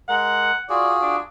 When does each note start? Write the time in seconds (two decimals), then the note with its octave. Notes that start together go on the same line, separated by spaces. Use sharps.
0.09 G#3 A#4 F#5
0.69 F4 F#4 G#4 D5
1.01 D4